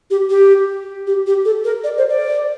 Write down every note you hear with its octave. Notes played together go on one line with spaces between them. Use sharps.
G4
G4
G4
G4
A4
A#4
D5
C5
D5